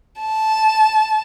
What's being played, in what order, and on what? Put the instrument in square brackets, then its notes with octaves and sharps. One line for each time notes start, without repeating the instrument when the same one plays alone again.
[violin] A5